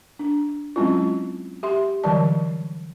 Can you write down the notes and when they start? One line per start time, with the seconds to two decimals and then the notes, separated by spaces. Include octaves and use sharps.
0.19 D4
0.76 F#3 G#3 C4 C#4 E4 F4
1.63 G4 E5 C6
2.04 D3 E3 F#3 G3 D5 A5